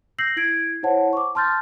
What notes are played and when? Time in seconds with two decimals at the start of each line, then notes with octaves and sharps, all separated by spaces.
0.19 E6 G6 A#6 C7 F#7
0.37 E4 G#6 D7
0.83 E4 C5 C#5 F#5 A5
1.13 C#6 D6
1.35 A5 C6 F6 G6 A6